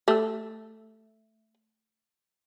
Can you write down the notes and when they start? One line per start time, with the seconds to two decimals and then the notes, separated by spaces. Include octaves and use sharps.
0.08 A3 G4 E6